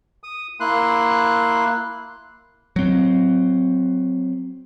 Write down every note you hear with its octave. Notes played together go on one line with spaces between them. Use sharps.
D#6
A#3 E4 C6 F#6
F#3 C4